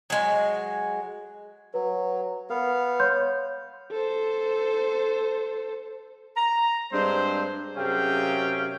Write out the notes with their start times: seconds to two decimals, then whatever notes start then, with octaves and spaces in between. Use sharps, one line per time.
0.10 F#3 G#3
1.74 F#3 B4
2.50 B3 A#4 F5
3.00 C#5 C6 G6
3.91 A4 C5
6.37 A#5
6.92 G2 G#3 C4 D4 C5
7.76 F#2 C3 C#4 G#4 F5 G5